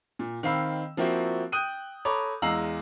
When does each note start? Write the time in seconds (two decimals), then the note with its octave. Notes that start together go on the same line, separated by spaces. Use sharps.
0.19 A#2
0.43 D#3 C4 F5 B5 E6
0.97 F3 A#3 C4 E4 F#4
1.52 G5 D#6 F#6 G6 D#7
2.05 A4 C#5 A#5 B5 D6
2.42 E2 G#3 F5 A#5 E6 F#7